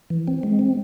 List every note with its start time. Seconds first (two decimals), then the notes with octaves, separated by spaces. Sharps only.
0.10 E3
0.27 C4
0.43 G#3
0.59 C4